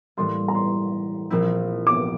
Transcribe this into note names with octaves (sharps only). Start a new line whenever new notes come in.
A2 E3 G3 A#3 C6
A#5
C6
A#1 A#2 F3 C4 E4
D6